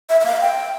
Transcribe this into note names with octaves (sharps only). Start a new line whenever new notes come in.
E5
E5
F5
G5